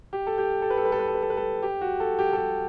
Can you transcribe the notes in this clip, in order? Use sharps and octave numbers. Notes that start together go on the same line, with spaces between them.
G4
A4
G4
A4
B4
A4
B4
A4
B4
A4
B4
A4
B4
A4
G4
F#4
A4
G4
A4
G4